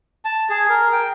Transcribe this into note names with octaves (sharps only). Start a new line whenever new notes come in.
A5
G#4
A#4
G5